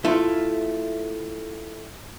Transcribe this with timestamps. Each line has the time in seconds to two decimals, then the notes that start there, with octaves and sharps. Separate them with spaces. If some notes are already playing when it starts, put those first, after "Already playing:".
0.05 A3 E4 F4